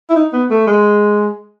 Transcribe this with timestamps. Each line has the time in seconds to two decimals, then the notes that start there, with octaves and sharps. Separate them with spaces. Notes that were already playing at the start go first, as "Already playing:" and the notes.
0.10 E4
0.16 D#4
0.33 B3
0.50 A3
0.67 G#3